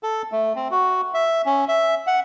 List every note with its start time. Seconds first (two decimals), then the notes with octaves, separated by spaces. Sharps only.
0.03 A4
0.32 A3
0.56 C4
0.71 F#4
1.14 E5
1.46 C#4
1.68 E5
2.07 F#5